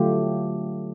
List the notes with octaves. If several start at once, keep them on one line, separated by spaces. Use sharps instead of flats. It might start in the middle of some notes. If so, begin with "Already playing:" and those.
Already playing: D3 F#3 A3 F4 G4